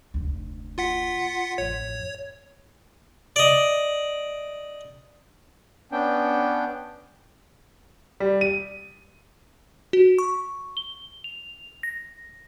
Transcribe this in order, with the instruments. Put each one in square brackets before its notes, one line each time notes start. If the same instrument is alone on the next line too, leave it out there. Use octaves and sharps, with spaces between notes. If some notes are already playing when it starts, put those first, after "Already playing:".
[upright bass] F1 D2
[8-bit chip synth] F4 F#5 B6
[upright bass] A1 F2 [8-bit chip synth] C#5
[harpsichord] D5 D#5
[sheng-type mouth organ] B3 C#4 D4 G5
[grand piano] G3
D#7
[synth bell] F#4
C#6
G7
F7
A#6